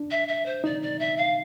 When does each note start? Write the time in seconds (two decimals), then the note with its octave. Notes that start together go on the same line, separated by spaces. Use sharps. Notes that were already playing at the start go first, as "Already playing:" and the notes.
Already playing: D4
0.11 E5
0.28 E5
0.45 C5
0.64 D#4 D5
0.82 D5
0.99 E5
1.17 F5